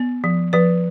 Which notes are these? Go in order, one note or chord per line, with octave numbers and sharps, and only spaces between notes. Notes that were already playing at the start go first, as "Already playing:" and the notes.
Already playing: B3
F3
F3 B4